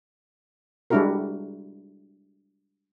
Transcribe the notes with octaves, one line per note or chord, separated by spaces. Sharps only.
G3 G#3 D4 E4 F#4 A#4